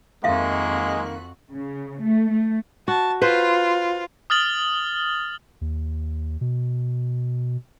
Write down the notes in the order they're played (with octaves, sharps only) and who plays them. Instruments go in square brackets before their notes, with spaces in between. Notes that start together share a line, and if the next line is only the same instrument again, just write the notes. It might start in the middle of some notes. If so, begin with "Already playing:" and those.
[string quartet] F2 F#4 F#6 [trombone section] D#3 A#3 [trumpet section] G#3 [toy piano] E5 F5
[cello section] C#3
A3
A3
[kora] F#4 [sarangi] A5
[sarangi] F4 [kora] B4 C5
[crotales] D#6 F6 A6 F#7 G7
[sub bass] D#2
B2